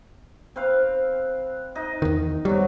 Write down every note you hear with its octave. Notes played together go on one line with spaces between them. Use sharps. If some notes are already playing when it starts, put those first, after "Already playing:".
C4 B4 F5
D#4 D#5
E2 D#3
F#3 G3 B3